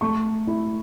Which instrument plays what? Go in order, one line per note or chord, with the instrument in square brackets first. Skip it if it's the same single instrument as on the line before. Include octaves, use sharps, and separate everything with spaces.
[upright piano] A3 C#6
E4